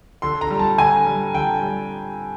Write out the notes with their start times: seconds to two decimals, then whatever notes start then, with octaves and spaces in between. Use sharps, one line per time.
0.22 D3 C6
0.41 A#5
0.50 G3
0.59 A5
0.78 D3 G#5
1.06 G3
1.34 D3 G5
1.62 G3